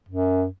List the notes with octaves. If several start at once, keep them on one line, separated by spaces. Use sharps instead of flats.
F#2